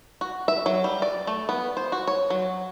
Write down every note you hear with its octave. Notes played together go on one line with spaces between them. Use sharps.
F#4
E5
F#3
G3
D5
A3
B3
C5
F#4
C#5
F#3